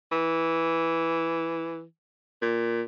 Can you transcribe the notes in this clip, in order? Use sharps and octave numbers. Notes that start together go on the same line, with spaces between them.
E3
A#2